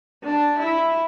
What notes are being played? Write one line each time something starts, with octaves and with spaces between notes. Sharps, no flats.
D4
E4